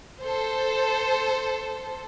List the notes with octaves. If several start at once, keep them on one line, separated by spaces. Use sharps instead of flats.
A4 C5